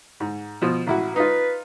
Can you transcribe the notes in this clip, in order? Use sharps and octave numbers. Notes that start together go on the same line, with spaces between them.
G#2
B2 F3
A1 E4 F#4
D#4 F4 B4